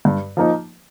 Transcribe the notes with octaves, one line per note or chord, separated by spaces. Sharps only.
G2
F3 A#3 D#4